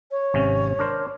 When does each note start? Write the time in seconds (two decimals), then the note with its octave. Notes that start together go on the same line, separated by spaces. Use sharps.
0.11 C#5
0.34 G#1 C3 C#4
0.79 D4 A#4 C5